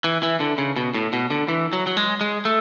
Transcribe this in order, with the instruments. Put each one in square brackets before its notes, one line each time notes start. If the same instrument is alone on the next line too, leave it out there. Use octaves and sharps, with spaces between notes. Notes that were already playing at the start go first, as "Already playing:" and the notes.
[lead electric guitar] E3
E3
D3
C#3
B2
A2
B2
D3
E3
F#3
F#3
G#3
G#3
A3